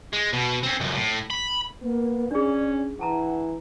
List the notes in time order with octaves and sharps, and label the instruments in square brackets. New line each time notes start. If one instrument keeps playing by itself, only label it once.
[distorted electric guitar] G#3
B2
C4 C#4
C#2 F#2
A2
B5
[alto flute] A#3 [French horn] B3
[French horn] C#4 [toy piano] D4 G#4 [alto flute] D5
[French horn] E3 [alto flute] F#5 [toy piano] G5 A5 A#5